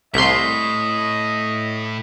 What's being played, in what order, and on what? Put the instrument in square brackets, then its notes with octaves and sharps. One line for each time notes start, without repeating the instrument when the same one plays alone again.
[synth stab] C2 C6 [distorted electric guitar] A2 [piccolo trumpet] D#5 [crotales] B6